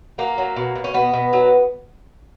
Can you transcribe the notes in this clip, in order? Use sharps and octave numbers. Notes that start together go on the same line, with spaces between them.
F#3 A#3
F#3
B2
B2
C#4
B2 B3
B2
F#3